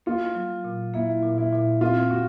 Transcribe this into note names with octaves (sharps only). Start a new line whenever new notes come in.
A#3 F4
F#3
A#2
A#3 E4
A#2
E4
A#2
C4 F4
F#4